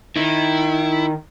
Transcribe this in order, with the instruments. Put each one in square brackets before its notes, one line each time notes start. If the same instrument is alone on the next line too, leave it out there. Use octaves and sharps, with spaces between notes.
[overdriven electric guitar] D#3 [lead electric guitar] E4